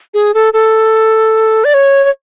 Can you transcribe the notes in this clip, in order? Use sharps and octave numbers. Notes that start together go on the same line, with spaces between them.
G#4
A4
A4
D5
C#5
C#5